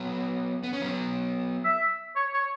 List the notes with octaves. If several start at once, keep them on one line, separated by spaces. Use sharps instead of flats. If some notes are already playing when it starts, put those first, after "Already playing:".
Already playing: F#3 B3
B3
C#4
F#3 B3
E5
C#5
C#5